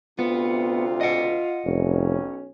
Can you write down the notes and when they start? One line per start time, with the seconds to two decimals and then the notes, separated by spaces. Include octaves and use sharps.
0.19 D2 C3 B3 F4
1.01 D#5 F#5
1.65 F1 B1 C#4